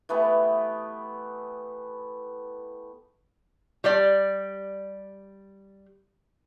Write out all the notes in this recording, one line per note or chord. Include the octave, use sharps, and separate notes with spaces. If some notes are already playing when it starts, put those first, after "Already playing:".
E3 A3 B3 G4
G3 G4 D5